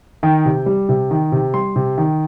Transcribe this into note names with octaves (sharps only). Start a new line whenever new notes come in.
D#3 G5
C3
G3
C3
D#3
C3
G3 C6
C3
D#3